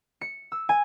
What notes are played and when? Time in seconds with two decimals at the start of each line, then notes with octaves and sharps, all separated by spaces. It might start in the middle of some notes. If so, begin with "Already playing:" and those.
0.21 C#7
0.52 E6
0.69 G#5